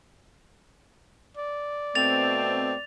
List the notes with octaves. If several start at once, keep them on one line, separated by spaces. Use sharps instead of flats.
D5
B2 A3 C4 A6 F7